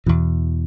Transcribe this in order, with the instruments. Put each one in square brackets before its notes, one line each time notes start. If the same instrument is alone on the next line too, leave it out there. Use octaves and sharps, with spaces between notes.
[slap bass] E2 B2 E3